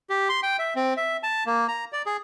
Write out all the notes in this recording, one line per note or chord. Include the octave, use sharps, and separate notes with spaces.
G4
C6
G5
E5
C4
E5
A5
A#3
A#5
D5
G#4